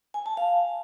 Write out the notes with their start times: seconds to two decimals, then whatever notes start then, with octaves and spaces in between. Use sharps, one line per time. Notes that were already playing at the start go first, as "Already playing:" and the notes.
0.14 G#5
0.26 A5
0.37 F5